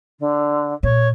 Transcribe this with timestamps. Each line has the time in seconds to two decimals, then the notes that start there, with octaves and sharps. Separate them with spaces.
0.19 D3
0.83 A#2 C#5